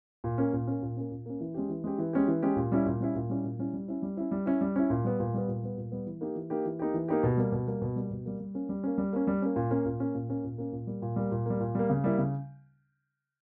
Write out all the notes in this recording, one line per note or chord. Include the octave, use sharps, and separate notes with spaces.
A#2
A#3 C#4
A#2
A#3 C#4
A#2
A#3 C#4
A#2
A#3 C#4
E3
G#3 C#4 G4
E3
G#3 C#4 G4
E3
G#3 C#4 G4
E3
G#3 C#4 G4
A#2
G3 C#4 E4
A#2
G3 C#4 E4
A#2
G3 C#4 E4
A#2
G3 C#4 E4
G3
C#4 E4
G3
C#4 E4
G3
C#4 E4
G3
C#4 E4
A#2
G3 B3
A#2
G3 B3
A#2
G3 B3
A#2
G3 B3
E3
A#3 D#4 G4
E3
A#3 D#4 G4
E3
A#3 D#4 G4
E3
A#3 D#4 G4
B2
G3 A#3
B2
G3 A#3
B2
G3 A#3
B2
G3 A#3
G3
A#3 C#4
G3
A#3 C#4
G3
A#3 C#4
G3
A#3 C#4
A#2
A#3 C#4
A#2
A#3 C#4
A#2
A#3 C#4
A#2
A#3 C#4
A#2
G3 A#3
A#2
G3 A#3
A#2
G3 A#3
A#2
G3 A#3
C#3
G3 A#3 E4
C#3